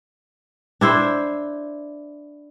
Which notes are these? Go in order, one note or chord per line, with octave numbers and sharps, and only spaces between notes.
D4 E4 C5